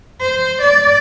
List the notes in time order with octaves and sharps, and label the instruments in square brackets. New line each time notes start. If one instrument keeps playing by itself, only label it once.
[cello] C5
D5